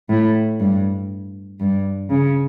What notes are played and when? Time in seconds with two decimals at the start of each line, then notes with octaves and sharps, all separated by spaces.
0.10 A2
0.60 G2
1.60 G2
2.10 C#3